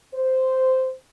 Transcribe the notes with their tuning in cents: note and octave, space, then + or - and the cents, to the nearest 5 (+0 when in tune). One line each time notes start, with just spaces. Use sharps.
C5 -10